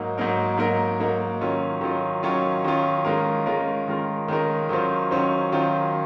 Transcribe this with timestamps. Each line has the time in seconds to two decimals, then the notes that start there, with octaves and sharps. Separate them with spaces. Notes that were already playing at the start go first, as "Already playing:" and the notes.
Already playing: G#2 F#3 A#3 D#4 A#4
0.18 G#2 F#3 A#3 D#4 A#4
0.58 G#2 F#3 A#3 D#4 A#4
1.00 G#2 F#3 A#3 D#4 A#4
1.41 D#3 F#3 C#4 F4
1.81 D#3 F#3 C#4 F4
2.23 D#3 F#3 C#4 F4
2.64 D#3 F#3 C#4 F4
3.05 D#3 G#3 C#4 F4 A#4
3.46 D#3 G#3 C#4 F4 A#4
3.88 D#3 G#3 C#4 F4 A#4
4.28 D#3 G#3 C#4 F4 A#4
4.69 D#3 F#3 C#4 F4 C5
5.11 D#3 F#3 C#4 F4 C5
5.52 D#3 F#3 C#4 F4 C5